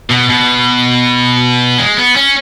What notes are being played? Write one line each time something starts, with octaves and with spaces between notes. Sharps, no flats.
B2
B2
G#3
B3
C#4